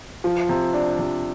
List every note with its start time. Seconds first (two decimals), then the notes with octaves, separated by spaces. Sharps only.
0.24 F3
0.49 C3
0.74 D4
0.99 C3